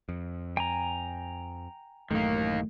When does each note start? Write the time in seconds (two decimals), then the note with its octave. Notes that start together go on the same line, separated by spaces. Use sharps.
0.09 F2
0.57 G5 G#5 A#5
2.11 A1 F#2 D#3 A3 A#3